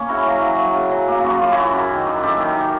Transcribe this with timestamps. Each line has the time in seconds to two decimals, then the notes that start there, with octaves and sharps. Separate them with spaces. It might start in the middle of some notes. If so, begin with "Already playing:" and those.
Already playing: A#3 C#4
0.09 C#3 E4 F#4
0.25 F#3
0.42 F#3
0.58 F#3
0.74 C#3
0.91 F#3
1.08 A#3
1.24 F#2 F#4
1.38 F#2 F4
1.52 E4 F#4
1.57 F#2
1.73 F#2
1.90 D#3
2.07 F#2
2.23 F#2 G4 A4
2.40 D#3
2.56 D#3